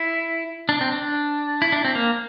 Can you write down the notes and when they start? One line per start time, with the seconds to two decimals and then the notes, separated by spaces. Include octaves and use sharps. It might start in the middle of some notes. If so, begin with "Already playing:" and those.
Already playing: E4
0.69 D4
0.81 C4
0.92 D4
1.62 E4
1.72 D4
1.85 C4
1.95 A#3